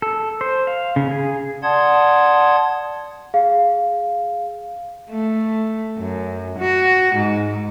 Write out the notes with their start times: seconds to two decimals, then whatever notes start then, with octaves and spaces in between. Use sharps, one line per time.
0.02 A4
0.41 C5
0.67 F5
0.96 C#3
1.11 G#4
1.63 D5 F#5 A5 C6 D#6 G#6
3.34 G#4 F5
5.10 A3
5.98 F#2
6.58 F#4
7.15 G#2